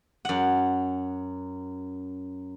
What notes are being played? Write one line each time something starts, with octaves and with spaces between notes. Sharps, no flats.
F#2 F#5